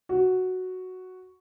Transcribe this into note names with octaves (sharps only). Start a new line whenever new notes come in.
F#4